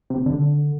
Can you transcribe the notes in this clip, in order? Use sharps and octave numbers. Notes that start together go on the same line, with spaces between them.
C3
D3